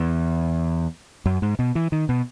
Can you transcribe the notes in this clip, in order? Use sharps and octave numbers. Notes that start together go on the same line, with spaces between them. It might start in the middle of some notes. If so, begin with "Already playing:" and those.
Already playing: E2
F#2
G#2
B2
E3
D#3
B2